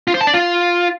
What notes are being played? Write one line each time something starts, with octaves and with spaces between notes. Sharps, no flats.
F4
C5
A5
D5
F4